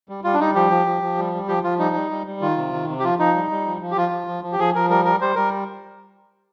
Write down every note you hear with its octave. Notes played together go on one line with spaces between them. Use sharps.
G3
G3 F4
D4
G3 D#4
F3 G4
F3
F3
F3
G3
G3
F3 G4
F3 F4
G3 D#4
G3
G3
G3
D#3 F4
C3
D#3
C3
G4
F3 F4
F3 D#4
G3
G3
F3
F3
G4
F3 F4
F3
F3
F3
G4
F3 G#4
F3 A#4
G3 A#4
G3 A#4
G3 C5
G3 A#4